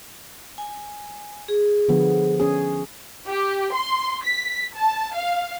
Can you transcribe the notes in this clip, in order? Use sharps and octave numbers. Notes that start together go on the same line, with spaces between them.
G#5
G#4
D3 F3 B3
C#4 G#4
G4
C6
B6
A5
F5